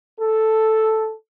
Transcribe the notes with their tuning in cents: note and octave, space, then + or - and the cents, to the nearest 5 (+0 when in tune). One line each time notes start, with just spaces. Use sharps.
A4 +0